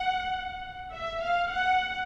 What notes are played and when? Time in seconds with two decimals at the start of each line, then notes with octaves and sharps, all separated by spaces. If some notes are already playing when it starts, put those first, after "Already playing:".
Already playing: F#5
0.93 E5
1.23 F5
1.52 F#5